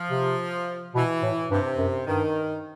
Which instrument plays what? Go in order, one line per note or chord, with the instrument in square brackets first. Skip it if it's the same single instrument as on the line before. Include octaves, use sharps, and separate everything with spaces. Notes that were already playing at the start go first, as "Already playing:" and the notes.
Already playing: [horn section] F3
[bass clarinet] C3
[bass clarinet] B2 [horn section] E3
[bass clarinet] A2
[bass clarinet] G2 [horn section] C3
[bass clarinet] F#2
[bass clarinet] G2 [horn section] D#3